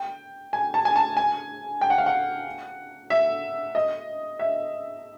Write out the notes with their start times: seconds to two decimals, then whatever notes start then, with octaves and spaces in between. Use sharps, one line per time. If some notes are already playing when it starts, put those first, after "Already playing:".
Already playing: G5
0.53 G#5
0.74 A5
0.85 G#5
0.96 A5
1.17 G#5
1.81 G5
1.90 F#5
1.98 F5
2.06 F#5
3.10 E5
3.75 D#5
4.39 E5